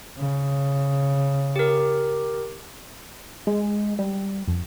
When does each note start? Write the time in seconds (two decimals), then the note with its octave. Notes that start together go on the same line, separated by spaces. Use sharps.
0.17 C#3
1.56 G4 A#4
3.47 G#3
3.99 G3
4.48 F2